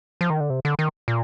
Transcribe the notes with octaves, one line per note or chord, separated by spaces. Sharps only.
F3
D#3
D3
C3
D3
D#3
A#2